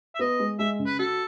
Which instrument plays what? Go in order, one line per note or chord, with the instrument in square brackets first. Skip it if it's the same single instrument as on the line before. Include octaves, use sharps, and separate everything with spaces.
[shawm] E5
[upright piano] B3 [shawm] D#5
[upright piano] G#3
[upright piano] G#3 [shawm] E5
[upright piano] C#3
[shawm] B4
[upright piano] F#4 [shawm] A4